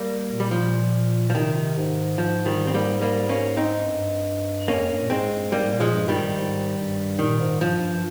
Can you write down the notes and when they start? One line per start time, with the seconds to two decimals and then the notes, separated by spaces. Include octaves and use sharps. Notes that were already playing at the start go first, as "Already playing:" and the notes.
Already playing: G3 A#3
0.30 A#2
0.40 G3
0.51 F3
1.30 F3
1.34 C3 D#3
1.77 G#2
2.18 F3
2.46 D#3 G3
2.67 C4
2.74 G3 A#3
3.01 G3 A#3
3.29 A#3 C#4
3.57 C4 D#4
3.85 G2
4.68 F2 A#3 C#4
4.90 G2
5.02 A#2
5.10 G#2 G#3 C4
5.32 G2
5.52 G#2 G3 A#3
5.73 A#2
5.80 F3 G#3
5.94 G2
6.08 D#3 G3
6.14 G#2
6.35 G#2
6.77 G2
7.19 A#2 D#3
7.40 G#2
7.61 G2 F3
7.81 G2